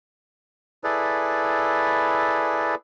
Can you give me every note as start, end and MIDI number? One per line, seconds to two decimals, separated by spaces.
0.84 2.75 64
0.84 2.75 68
0.84 2.75 69
0.84 2.75 71
0.84 2.75 74